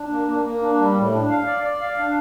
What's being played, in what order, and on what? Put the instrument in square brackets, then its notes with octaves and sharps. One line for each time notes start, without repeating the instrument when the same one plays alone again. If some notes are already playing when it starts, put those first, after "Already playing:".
Already playing: [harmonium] D4
A#3
A#3
A#3
D4
G3
A2
D4
F5
D5
D5
F5
D4